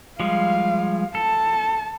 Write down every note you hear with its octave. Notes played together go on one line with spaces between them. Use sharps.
F3 G3 G#3 F5
A4 A5